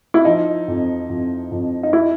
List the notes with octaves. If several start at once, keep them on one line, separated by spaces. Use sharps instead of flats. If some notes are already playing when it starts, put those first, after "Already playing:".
E4
F3 D#4
F2
F2
F2
D#4
E4